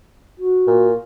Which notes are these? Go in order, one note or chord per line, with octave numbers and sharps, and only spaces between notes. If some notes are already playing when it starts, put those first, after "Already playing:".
F#4
A#2